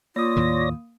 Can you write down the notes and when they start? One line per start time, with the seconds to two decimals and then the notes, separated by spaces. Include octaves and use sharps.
0.16 A#3 F4 C#5 D5 D#6 A#6
0.36 D#2 A2 D#3